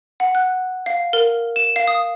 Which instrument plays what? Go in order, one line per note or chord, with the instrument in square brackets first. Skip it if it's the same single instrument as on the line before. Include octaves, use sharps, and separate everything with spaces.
[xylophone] F#5
F#6
F5
A#4
E7
F5
D#6